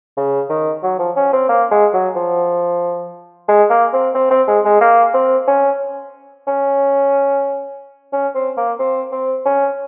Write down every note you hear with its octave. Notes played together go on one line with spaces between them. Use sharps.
C#3
D#3
F#3
F3
C#4
C4
A#3
G#3
F#3
F3
G#3
A#3
C4
C4
C4
G#3
G#3
A#3
C4
C#4
C#4
C#4
C4
A#3
C4
C4
C#4